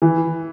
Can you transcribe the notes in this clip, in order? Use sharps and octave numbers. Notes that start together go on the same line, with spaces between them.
E3